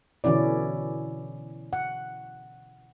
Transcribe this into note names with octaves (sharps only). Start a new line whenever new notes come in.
B2 D3 E3 C#4 E4 D5
F#5